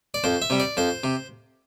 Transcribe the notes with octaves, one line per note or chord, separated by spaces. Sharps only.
D5
F2 C5
E5
C3 G3
D5
F2 C5
C3